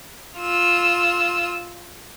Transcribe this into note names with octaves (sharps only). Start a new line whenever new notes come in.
F4 E6